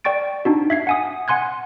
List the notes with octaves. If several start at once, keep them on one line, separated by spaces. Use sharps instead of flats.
D5 G5 C#6 A6 D7
D4 D#4 F#4
E5 G#6 C7
F#5 G#5 D#6
F#5 G#5 C6 F#6 G#6